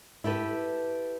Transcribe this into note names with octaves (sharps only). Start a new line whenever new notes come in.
E4 G4 A4 B4